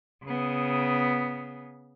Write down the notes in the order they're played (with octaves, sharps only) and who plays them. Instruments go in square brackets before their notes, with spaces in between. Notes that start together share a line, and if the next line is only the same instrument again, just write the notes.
[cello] C#3 B3